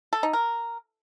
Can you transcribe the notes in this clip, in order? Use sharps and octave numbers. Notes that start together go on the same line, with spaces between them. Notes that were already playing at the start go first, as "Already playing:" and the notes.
A4
D#4
A#4